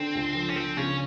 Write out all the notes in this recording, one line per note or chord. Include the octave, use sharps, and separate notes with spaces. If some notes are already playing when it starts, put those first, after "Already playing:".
Already playing: D3 C4
C#2
F3
C#4
F3 C4
C#3 C#4